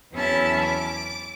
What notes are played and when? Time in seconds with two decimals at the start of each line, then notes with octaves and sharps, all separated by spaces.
0.13 E2 F#3 C#4 E4 E5 A5
0.63 D6